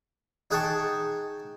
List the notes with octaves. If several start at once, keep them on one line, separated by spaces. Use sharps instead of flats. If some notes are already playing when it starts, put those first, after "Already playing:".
D#4 G#4 F#5 G5 A5 C#6